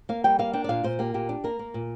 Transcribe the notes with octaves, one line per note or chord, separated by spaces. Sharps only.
A#3 F5
G3 G5
A#3 F5
D4 G5
D5
A#2 F5
A#2 C5
A#3 G4
A#2 G4
D4
A#3 A#4
A#3
A#2